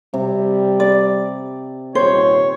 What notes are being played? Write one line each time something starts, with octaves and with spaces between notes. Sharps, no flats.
C3 G3
D5
D#1 C5 C#5